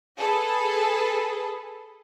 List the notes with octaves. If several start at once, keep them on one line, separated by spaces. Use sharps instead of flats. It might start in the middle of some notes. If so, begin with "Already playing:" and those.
G#4 A4 B4